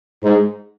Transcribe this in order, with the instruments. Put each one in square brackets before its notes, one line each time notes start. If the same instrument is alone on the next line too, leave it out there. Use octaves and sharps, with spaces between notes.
[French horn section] G#2